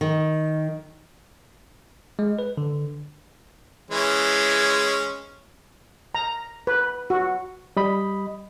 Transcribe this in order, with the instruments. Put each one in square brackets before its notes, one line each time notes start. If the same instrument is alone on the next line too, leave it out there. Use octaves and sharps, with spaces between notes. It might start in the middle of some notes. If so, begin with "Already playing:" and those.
[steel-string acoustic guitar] D#3
[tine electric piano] G#3
B4
D3
[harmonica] E3 G#3 C#4
[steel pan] A#5
B4
F#4
[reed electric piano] G3 D#5 B5